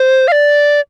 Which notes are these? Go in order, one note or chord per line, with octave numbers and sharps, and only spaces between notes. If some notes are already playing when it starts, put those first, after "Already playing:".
Already playing: C5
F5
D5